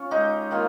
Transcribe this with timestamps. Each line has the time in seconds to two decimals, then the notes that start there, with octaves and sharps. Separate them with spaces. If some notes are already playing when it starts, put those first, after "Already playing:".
Already playing: C#4 F4
0.11 G#3 D#4 G4
0.51 D#3 A#3 F4